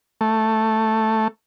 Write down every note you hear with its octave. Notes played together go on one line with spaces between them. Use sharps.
A3